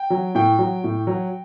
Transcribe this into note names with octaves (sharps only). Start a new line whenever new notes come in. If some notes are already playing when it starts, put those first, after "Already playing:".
Already playing: G5
F#3
A2 G5
F#3
A2
F#3